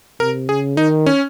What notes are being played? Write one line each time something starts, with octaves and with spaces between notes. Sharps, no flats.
C3 A#4
C#3 G#4
D#3 D#4
C#4